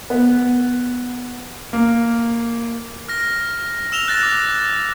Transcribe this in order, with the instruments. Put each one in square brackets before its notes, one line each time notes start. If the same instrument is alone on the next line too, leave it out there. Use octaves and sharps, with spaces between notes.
[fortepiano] B3
[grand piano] A#3
[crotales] F6 A#6
E6 E7 F7 G7
F#6 A6 A#6
D6